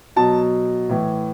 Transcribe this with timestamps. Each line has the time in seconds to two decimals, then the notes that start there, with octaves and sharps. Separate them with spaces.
0.16 B2 F#3 A5
0.89 A2 E3